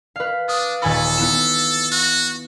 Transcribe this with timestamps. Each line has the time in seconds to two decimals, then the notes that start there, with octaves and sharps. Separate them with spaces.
0.16 B4 F5
0.48 D4 D#6
0.82 D#1 A4 G#5 B5
1.18 B3 E4 E7
1.91 F#4